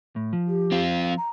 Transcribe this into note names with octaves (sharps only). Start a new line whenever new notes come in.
A2
F3
G4
C4 F4
F5
A#5